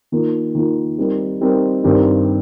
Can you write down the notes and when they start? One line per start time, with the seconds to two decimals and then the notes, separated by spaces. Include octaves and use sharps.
0.12 D#3 A#3 F4 A#4
0.55 D#3 A#3 F4 A#4
0.98 G3 C4 D#4 A#4
1.41 G3 C4 D#4 A#4
1.84 G2 D#3 C4 G4 A#4